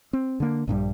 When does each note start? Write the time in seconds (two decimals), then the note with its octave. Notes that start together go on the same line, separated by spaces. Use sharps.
0.13 C4
0.40 D3 A#3
0.67 A#1 G2 C#3 G3